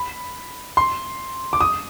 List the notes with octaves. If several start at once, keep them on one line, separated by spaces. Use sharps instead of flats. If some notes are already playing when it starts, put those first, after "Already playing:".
Already playing: B5
C6
D6
D#6